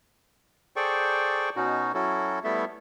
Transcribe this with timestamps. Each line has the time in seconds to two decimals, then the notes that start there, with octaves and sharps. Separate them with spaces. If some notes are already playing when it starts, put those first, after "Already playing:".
0.76 G#4 A4 C5 D5 G5 C#6
1.56 B2 C#4 D#4 F#4
1.94 F#3 C#4 E4 F#4 A4
2.44 G3 A3 B3 E4 A4 E5